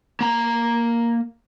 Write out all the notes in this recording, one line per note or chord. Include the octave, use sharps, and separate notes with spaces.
A#3 A#5